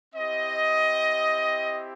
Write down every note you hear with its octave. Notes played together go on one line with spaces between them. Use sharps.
C4 E4 G4 D#5